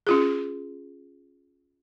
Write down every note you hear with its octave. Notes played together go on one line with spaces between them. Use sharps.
C#4 F4 G#4